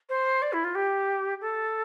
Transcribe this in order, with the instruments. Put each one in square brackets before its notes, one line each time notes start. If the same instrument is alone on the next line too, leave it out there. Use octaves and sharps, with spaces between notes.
[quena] C5
D5
E4
F4
G4
A4